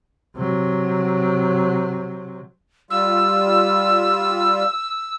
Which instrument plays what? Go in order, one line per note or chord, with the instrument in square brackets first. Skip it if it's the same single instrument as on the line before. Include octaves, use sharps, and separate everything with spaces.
[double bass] C3 F#3
[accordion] G3 F4 [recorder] E6